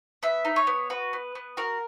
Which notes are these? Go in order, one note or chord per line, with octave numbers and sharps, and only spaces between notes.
B3 E5
D#4
C#5
B3
F#4 B4
B3
B3
F#4 A#4